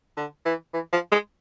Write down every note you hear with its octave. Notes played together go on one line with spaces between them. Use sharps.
D3
E3
E3
F3
G#3